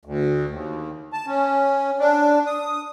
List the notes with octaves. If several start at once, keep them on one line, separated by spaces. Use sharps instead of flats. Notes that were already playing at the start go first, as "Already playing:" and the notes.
D2
D#2
A5
C#4
D4
D#6